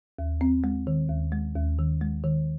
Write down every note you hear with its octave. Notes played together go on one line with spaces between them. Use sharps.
D#2
C4
G#3
D#3
D#2
G#3
D#2
D#3
G#3
D#3